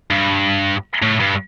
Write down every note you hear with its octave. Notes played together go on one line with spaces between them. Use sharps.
G2
A2
G2